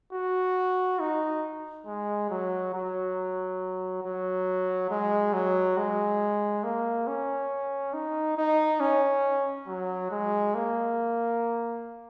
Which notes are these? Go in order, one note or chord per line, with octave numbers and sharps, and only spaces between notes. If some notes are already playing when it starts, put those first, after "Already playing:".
F#4
D#4
G#3
F#3
F#3
F#3
G#3
F#3
G#3
A#3
C#4
D#4
D#4
C#4
F#3
G#3
A#3